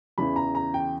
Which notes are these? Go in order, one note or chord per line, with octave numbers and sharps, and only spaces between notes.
E2 C#3 E3 B5
A#5
A#5
G5